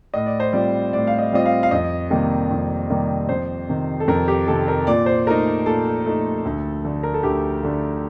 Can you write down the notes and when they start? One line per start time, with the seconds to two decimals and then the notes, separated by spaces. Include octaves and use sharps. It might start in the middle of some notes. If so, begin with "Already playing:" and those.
0.14 A2 D#5
0.26 D5
0.40 C5
0.53 G3 C4 F4 D5
0.93 A2 D5
1.07 F5
1.18 D#5
1.32 G3 C4 F4 D#5
1.45 F5
1.63 F5
1.71 F2 D#5
2.10 C3 D#3 G3 A#3
2.51 F2
2.90 C3 D#3 G3 A#3
3.29 F2 C5
3.69 C3 D#3
4.00 A4
4.08 F2 A#4
4.28 G4
4.48 C3 D#3 A4
4.68 A#4
4.87 A#2 D5
5.06 C5
5.27 A3 D#4 A#4
5.66 A#2 A4
6.06 A3 D#4
6.45 D2
6.85 D3 A3
7.03 A#4
7.14 A4
7.23 D2 G4
7.63 D3 A3